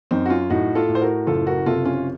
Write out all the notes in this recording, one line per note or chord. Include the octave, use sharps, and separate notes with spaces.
F#2 C4 D#4
F#4
C#4 F4
A2 D#4 F#4
F4 A4
A2
C5
F#4 A#4
F#1 F4 A4
F#4 A#4
C3 F4 A4
C#4 F4